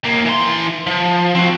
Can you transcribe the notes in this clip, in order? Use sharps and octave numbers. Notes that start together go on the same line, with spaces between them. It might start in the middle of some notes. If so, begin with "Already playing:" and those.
D#2 A#3
E3 C6
F3
C4 F#4